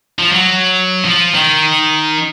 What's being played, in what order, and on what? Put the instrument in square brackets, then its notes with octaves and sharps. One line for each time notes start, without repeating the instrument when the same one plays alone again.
[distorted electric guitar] F3
F#3
F3
D#3